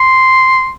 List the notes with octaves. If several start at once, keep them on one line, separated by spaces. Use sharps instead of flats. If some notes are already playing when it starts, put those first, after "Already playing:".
Already playing: C6